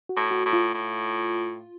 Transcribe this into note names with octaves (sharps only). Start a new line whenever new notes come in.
F#4
A2
F#4
A2
F4
A2